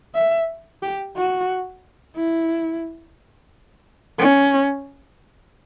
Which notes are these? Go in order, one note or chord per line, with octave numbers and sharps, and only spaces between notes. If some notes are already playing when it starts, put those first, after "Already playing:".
E5
G4
F#4
E4
C#4